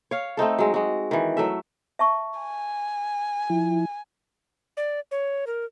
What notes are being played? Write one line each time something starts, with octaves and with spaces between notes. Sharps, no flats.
C#5 F5
A3 C4 D#4 A4
F#3 G#3
G#3 F#4
D#3 E3
F#3 A3 E5
E5 A5 C#6
G#5
F3 E4
D5
C#5
A#4